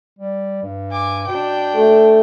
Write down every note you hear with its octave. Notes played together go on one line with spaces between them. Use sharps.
G3
G2
G#5 D6
B2 D4 G5
A3